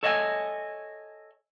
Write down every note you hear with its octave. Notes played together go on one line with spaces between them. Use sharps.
A4 C#5 D#5 E5 F#5 G#5